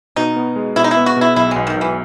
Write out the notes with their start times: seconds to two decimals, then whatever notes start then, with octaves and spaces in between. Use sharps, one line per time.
0.16 B2 D#4
0.36 B3
0.56 G#3
0.76 B2 E4
0.84 D#4
0.91 E4
0.97 B3
1.06 F#4
1.17 B2 E4
1.36 B1 E4
1.51 B1 G#3
1.67 D#3
1.77 B1 E3